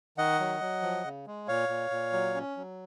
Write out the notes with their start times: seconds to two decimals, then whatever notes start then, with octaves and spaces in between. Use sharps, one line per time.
0.17 D#3 D#5 F#5
0.40 F#3
0.61 F#3
0.82 F3
1.04 C#3
1.27 G#3
1.48 A#2 C#5 F5
1.69 A#2
1.91 A#2
2.13 F#3
2.35 C#4
2.57 F#3